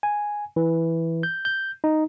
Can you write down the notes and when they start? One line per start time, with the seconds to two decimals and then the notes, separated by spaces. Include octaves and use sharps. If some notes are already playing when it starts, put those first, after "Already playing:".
0.03 G#5
0.56 E3
1.23 G6
1.45 G6
1.84 D#4